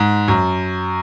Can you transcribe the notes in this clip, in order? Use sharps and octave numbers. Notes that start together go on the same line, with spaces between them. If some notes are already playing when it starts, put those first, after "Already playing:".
Already playing: G#2
F#2